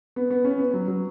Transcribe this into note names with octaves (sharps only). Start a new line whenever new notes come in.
B3
B3
C#4
B3
F#3
F#3